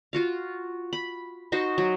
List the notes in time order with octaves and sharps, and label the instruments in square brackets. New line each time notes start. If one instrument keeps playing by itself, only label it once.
[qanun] F4 F#4 F5
B5
D#4 F#4 C5
F#3